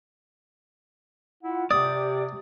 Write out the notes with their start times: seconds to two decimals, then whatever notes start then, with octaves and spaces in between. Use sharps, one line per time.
1.43 E4 F4 F#5
1.71 C3 G4 D5 D6 D#6